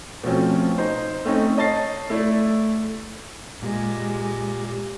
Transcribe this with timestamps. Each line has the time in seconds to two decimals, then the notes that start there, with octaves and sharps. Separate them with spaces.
0.23 B2 F3 A3 C4 C#4
0.78 D#4 C5
1.25 A3 C4 C#4 D#4
1.57 C#5 D#5 A5 A6 C7
2.10 A3 E4 A4 D5
3.63 A#2 G#3 G4